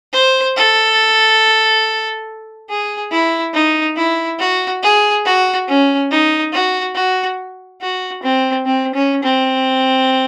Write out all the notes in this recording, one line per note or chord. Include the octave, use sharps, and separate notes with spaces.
C5
A4
G#4
E4
D#4
E4
F#4
G#4
F#4
C#4
D#4
F#4
F#4
F#4
C4
C4
C#4
C4